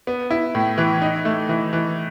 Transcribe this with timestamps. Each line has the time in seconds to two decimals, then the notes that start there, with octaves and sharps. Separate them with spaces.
0.07 B3
0.31 E4
0.55 A2
0.78 E3
1.02 D#4
1.25 A3
1.49 E3
1.73 E3